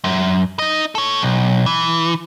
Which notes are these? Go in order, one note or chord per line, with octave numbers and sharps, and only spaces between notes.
F#2
D#4 D#5
A4 C#5
B1
E3